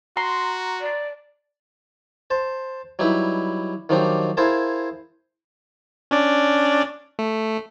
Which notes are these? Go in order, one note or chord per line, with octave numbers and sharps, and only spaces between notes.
F#4 A#5 C6
D5
C5 A5
F#3 G3 D#4 E4 B4
D#3 F3 F#3 D4 D#4 G4
E4 G#4 A#4 C5 F5 A5
C#4 D4 D5
A3